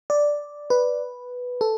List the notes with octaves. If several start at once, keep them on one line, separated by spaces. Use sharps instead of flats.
D5
B4
A4